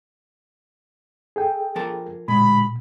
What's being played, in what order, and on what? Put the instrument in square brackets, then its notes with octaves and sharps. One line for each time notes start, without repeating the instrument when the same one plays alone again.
[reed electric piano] G#4 A4 G5
[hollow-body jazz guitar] F3 A#4 A5
[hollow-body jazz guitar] D2 G#3 [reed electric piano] A#2 [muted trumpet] B5